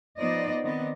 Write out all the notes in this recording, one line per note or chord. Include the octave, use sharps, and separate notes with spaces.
F3 B3 D#4 C5 D5 D#5
D#3 B3 C4 D5 D#5